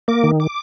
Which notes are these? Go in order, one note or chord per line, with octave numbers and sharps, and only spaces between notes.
A#3 D6
D#3
D6